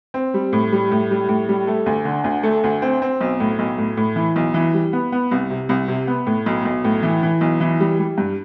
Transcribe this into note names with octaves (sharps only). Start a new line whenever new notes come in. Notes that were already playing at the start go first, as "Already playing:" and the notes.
C4
G3
A2
G3
A2
G3
A2
G3
A3
D2
D3
D2
A3
D2
C4
C4
B1
A2
B1
A2
A2
E3
B1
E3
G3
B3
B3
C2
C3
C2
C3
B3
A2
B1
B1
A2
E3
E3
B1
E3
G3
G3
G2